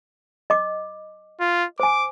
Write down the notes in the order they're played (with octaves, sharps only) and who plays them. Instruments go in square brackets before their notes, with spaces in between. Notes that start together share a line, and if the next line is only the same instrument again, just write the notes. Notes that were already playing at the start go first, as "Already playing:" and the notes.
[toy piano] D#5 D6
[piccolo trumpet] F4
[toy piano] C5 G#5 [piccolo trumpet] D6